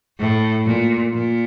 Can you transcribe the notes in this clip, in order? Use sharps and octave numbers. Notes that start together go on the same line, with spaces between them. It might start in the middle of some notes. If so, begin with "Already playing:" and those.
A2
A#2
A#2